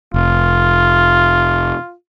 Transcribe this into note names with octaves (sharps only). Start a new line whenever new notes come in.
F1 F4